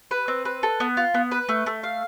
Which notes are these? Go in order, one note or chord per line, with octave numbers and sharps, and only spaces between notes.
B4
C4
B4
A4
B3
F4
B3
B4
A3
A3
F5